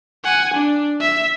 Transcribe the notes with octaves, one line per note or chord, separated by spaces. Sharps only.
F#5 G#5
D4
E5